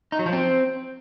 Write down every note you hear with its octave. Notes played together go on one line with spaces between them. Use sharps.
D#4
F#3
F3
C4